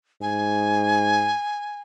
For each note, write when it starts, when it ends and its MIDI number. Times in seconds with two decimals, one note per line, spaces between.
0.22 1.32 44
0.22 1.81 80